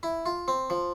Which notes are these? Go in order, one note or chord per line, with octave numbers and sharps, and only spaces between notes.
E4
F4
C4
F3